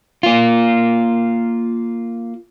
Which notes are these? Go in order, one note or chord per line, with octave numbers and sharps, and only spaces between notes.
A#3 F4